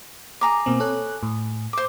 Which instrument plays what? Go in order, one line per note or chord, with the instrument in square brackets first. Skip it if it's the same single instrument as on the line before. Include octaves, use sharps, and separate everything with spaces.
[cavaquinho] G#4 A#5 D6
[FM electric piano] B2 A#3 C4
A4 C#5 F#6
A2
[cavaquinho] C5 D6